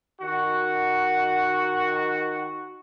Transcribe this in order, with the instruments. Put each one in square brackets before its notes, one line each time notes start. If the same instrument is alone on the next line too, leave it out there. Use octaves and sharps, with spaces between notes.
[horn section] D#3 F#4